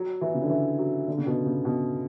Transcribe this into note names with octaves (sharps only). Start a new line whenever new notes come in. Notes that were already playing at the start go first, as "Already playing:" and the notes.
Already playing: F#3
E3
C#3
D3
E3
F#3
D3
C#3
B2
C#3
B2